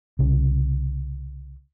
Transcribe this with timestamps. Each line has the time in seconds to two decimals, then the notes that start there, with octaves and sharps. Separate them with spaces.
0.19 C2 C#3